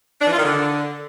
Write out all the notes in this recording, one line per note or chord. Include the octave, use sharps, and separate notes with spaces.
D4
E3
F4
D#3
D3